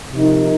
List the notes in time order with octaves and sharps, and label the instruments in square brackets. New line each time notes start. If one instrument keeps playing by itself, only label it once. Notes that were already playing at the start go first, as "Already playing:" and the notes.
[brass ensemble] C3 F3 D#4 A#4